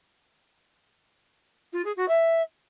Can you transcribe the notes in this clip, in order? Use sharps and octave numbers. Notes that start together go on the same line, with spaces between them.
F4
G#4
F#4
E5